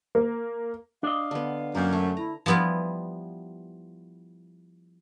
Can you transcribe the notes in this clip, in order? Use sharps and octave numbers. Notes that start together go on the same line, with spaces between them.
A#3
D4 D#5 F5
D3 B3
F#2 A#3
A3
E4 A#5
F3 G3 B3 E4 F4